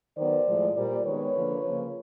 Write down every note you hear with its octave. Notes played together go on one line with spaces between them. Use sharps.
D#3 F#3 B3 C5 D5
A2 F3 G#3
A#2 G3 A#3 C5 D5
D#3 G#3 B3 B4 C#5
D3 F3 A#3
C#3 F3 A#3